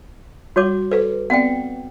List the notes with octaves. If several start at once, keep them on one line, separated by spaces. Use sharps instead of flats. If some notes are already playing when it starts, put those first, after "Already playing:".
G3 F#4 C#5 D6
A4 B4 C5
B3 C4 D5 F#5 G5